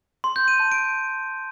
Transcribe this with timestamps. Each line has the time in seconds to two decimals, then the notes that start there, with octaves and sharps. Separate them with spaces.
0.24 C6
0.36 G6
0.48 D#7
0.60 A5
0.72 D7